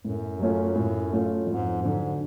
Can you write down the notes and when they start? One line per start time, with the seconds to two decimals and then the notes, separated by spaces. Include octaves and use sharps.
0.05 F#2 A2
0.39 F#3 A3 C#4 F4
0.76 A2
1.11 F#3 A3 C#4 F4
1.47 F2 G#2
1.82 G#2 D3 F#3